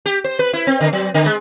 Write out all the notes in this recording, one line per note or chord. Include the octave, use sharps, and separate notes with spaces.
G4
C5
B4
E4
C4
D3
F#3
D3
G#3